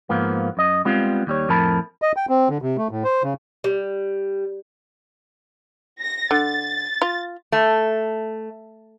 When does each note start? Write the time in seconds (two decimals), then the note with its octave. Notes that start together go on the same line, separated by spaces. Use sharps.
0.09 G#2 F3 A#3 B3
0.57 F#2 D#5
0.85 G3 G#3 B3 C4 F4
1.27 D#2 G3 C#5
1.49 F2 A2 A#4 A5 B5
2.02 D#5
2.16 G5
2.29 C4
2.50 D3
2.62 C3
2.78 A3
2.91 A2
3.04 C5
3.24 C#3
3.64 G3
6.01 A#6
6.31 D3 A6
7.02 F4
7.52 A3